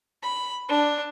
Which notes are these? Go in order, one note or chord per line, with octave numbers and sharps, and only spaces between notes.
B5
D4